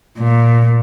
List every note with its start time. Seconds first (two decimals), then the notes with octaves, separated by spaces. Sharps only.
0.19 A#2